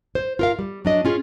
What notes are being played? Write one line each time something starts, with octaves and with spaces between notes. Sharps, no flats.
C5
F4 A#4 F5
G3
F#3 D4 D#5
C#4 F4 G#4